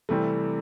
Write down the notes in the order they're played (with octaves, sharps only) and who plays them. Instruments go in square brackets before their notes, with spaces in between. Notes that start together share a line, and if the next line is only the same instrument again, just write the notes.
[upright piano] C3 E3 G3 C4 [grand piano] A3